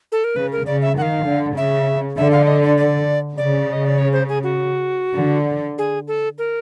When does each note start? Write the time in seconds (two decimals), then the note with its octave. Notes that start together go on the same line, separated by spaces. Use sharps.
0.12 A4
0.24 A#4
0.36 C#3 B4
0.52 A#4
0.67 C#3 D5
0.82 E5
0.97 D#3 F5 F#5
1.26 D3
1.57 C#3 E5
2.17 D3 E5
2.32 F5
2.43 D5
2.47 D#5
2.63 D5
2.77 D5
3.37 C#3 D5
3.73 D#5
3.85 D5
3.98 C#5
4.13 C5
4.28 G#4
4.43 F#4
5.18 D3
5.78 G#4
6.08 A4
6.38 A#4